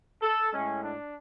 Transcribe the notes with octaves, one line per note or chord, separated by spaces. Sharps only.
A4
A2 G#3 C#4
D4